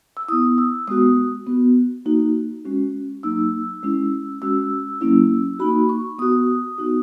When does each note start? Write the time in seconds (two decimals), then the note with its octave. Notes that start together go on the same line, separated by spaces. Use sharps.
0.17 E6
0.28 B3 E4 D#6
0.58 E6
0.88 G#3 B3 F#4 D#6
1.47 B3 F#4
2.05 A#3 D#4 F#4
2.65 G#3 C#4 F#4
3.23 F#3 A#3 D#4 E6
3.83 G#3 C#4 E4
4.42 G#3 C#4 F#4 E6
5.01 F#3 A#3 C#4 E4
5.59 A#3 D#4 F#4 B5
5.89 C#6
6.19 B3 F#4 D#6
6.78 B3 D#4 F#4